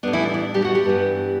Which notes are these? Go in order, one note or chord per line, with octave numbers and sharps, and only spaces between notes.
A2 G3 B3 D4
E3 E4
D4
D4
G3 G4
F#4 F#5
G3 G4
G2 E3 B3